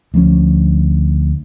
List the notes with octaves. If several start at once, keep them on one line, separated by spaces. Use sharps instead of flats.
D2 F3 B3 C#4